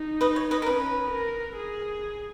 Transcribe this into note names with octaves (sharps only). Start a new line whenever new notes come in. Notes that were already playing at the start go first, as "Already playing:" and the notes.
Already playing: D#4
B4 D#5
C#5
B4 D#5
A#4
C#4 B4
A#4
G#4